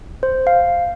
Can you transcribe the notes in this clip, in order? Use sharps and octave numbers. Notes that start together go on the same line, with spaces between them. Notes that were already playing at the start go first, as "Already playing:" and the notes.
C5
F5